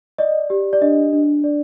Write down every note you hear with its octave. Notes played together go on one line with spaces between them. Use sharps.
D5 D#5
G4
D5
D4 D#5
D4
D5